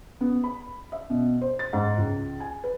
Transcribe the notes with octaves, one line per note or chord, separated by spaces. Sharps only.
B3
B5
E5
B2
C5
A6
G#2
C#2
G#5
B4